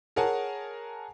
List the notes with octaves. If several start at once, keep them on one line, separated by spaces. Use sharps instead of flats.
G#4 A#4 C#5 F#5 G#5 A5